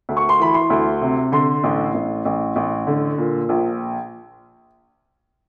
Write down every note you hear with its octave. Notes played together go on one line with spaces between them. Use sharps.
D2
C#6
C6
E3 B5
C6
D2
C3
D3 C6
A1
A1
A1
A1
D3
A#2
A#1